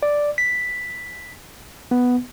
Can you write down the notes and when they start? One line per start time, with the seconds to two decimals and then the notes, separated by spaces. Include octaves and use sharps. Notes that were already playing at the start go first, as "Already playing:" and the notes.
0.03 D5
0.38 B6
1.91 B3